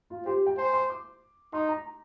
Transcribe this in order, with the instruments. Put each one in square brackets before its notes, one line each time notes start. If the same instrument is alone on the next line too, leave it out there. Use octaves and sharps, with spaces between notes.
[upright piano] F4
[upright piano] G4 [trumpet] C5
[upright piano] G5
[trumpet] C5 [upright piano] G#5
[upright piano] C6
D6
[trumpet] D#4 [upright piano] C6
[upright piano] A#5